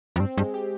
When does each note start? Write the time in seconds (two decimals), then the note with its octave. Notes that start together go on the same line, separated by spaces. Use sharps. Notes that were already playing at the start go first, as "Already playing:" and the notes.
0.16 F2
0.20 G2 C4
0.37 G2 G#3
0.54 G4